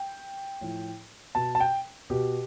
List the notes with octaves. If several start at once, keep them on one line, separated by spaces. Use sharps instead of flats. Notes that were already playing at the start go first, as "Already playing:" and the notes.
Already playing: G5
A2 F3
B2 A5
A5
G5
B2 G4